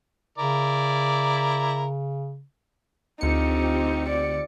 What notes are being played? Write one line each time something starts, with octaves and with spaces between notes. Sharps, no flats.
C#3 E4 A#4 D5
D2 C4 D#4 F4 G4 C#7
D5